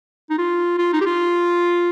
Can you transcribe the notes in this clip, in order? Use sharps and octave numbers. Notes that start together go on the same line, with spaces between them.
D#4
F4
F4
D#4
G4
F4